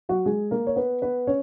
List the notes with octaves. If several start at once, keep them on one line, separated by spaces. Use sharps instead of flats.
F#3 F#4
G#3 G#4
A#3 A#4
C#5
B3 B4
B3 B4
C#4 C#5